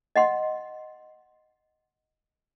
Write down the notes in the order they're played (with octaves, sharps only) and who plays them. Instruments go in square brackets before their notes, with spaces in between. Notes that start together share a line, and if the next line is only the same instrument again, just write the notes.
[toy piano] D#5 F#5 C6